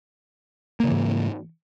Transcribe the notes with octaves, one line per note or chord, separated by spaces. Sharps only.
G#2 C#3 E3 A#3